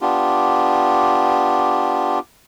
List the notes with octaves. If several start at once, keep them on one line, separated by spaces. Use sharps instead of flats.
B3 D4 F4 G4